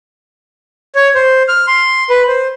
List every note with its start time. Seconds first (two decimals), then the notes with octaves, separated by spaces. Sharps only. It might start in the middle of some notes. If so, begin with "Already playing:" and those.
0.95 C#5
1.15 C5
1.48 F6
1.67 C6
2.10 B4
2.28 C5